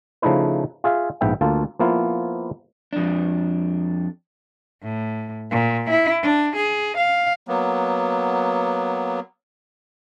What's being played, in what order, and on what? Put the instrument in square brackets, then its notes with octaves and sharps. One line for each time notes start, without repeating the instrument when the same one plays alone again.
[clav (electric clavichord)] C#3 F3 A3 D#4 E4 B4
F4 G#4 E5 F5
A#1 G#2 B3 E5 G5
D2 A#3 F4 A4
F3 A#3 B3 E4 F4
[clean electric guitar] F2 D4
[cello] A2
A#2
E4
D4
G#4
F5
[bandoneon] F#3 A#3 B3